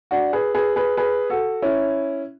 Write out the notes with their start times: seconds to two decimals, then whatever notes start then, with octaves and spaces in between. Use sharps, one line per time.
0.11 D4 F#4
0.33 G#4 B4
0.55 G#4 B4
0.76 G#4 B4
0.97 G#4 B4
1.30 F#4 A4
1.62 C#4 E4